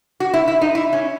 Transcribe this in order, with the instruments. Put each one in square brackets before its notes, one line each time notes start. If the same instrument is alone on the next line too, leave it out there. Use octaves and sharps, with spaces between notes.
[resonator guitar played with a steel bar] F#4
E4
E4
D#4
E4
C#4